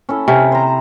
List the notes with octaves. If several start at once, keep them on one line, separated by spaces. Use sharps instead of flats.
C#4 E4 A4
C3 C#4
C5 A#5